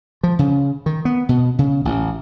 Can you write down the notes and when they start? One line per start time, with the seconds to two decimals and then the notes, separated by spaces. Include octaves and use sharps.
0.23 F3
0.39 C#3
0.86 D#3
1.05 B3
1.29 B2
1.59 C#3
1.85 A1